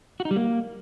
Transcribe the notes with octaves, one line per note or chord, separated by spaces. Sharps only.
F#4
D#4
G3
A#3